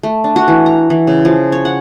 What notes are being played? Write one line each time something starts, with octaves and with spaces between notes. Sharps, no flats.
A3
D4
F#4
E3
A#5
E3
C#3
F3
C#5
F#5